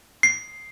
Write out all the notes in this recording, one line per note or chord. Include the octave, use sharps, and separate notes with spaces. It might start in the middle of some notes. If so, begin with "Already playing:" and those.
C7